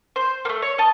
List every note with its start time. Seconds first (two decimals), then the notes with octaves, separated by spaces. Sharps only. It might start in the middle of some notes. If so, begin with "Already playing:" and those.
0.16 C5
0.45 A3 A#3
0.62 C#5
0.78 D#5 A5